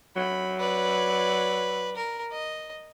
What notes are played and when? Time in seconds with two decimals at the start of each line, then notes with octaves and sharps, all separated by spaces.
0.16 F#3 B5
0.60 B4 D5
1.96 A#4
2.32 D#5